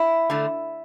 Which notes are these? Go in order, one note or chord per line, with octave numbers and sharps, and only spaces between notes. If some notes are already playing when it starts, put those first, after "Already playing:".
Already playing: E4
D3 A3